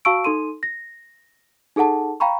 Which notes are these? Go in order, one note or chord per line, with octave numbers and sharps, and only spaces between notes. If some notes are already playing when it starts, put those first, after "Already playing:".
F#4 F5 A5 C#6 E6 D7
D#4 A4 C6 D#7
A#6
D#4 G#4 A4 F#5 A5
F5 G5 A#5 B5 C#6